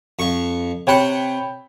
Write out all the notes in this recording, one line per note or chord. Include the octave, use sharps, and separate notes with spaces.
F2 C#6
C3 C#5 F#5 G5 B5